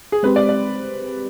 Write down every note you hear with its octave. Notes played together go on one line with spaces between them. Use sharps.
G#4
G#3 C4 G4 B4 C5
D5
D5